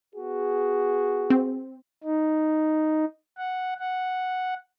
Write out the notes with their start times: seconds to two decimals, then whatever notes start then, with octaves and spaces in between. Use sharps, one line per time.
0.14 B3 F#4 G#4
1.30 C4
2.03 D#4
3.38 F#5
3.79 F#5